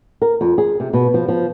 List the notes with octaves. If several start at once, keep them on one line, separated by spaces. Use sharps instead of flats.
A#4
F2
G#4
C3
B2
F3
F3